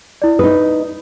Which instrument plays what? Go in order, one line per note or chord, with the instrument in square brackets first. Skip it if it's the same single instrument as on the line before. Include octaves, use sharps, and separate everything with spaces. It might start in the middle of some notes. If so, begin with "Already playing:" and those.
[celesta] E4 D5
[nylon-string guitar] D#4 B4 [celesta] D#6